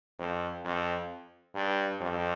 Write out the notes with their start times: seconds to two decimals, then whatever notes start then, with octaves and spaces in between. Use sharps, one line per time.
0.19 F2
0.64 F2
1.55 G2
2.01 F2